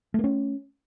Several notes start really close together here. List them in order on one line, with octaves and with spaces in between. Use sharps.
A3 A#3 C#4